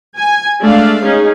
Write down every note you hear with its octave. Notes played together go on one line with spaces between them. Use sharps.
G#5
G#3 A3 D4 D5 F5
C#4 D#4 G#4